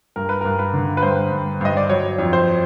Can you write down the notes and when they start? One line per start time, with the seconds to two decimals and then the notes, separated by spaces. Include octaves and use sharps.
0.16 G2 A#4
0.29 B4
0.41 A#4
0.45 G2
0.59 B4
0.73 D3
0.97 B4
1.03 G2 C5
1.31 G2
1.61 G2 D#5
1.77 D5
1.89 F#3 C#5
2.18 F2
2.33 C5